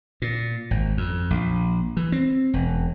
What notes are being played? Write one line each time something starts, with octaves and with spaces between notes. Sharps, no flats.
A#2
G#1
F2
A#1
E3
C4
E1